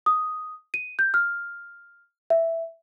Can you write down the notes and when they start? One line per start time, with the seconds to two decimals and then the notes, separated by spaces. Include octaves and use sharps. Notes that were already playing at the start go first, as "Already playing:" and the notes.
0.06 D#6
0.74 D#7
0.99 G6
1.14 F6
2.30 E5